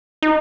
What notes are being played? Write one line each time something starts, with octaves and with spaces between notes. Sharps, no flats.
D#4